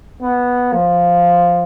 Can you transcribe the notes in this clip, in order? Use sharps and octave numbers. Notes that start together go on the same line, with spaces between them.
B3
F3